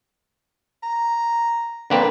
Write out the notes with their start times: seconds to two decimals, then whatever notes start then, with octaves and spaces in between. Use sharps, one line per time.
0.83 A#5
1.90 D3 A#3 C4 B4